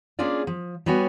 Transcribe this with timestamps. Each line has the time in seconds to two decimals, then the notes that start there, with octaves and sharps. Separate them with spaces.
0.19 A#3 C#4 D4 F4 G#4 D5
0.47 F3
0.86 G3 B3 F#4 C#5 G#5